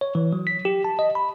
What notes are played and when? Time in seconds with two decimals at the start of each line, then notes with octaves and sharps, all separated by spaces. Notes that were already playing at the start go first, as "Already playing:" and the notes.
0.01 C#5
0.15 E3
0.33 F#3
0.47 B6
0.65 G4
0.84 A5
0.99 D#5
1.15 B5